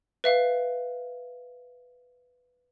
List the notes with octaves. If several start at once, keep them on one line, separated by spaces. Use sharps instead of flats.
B4 E5 F5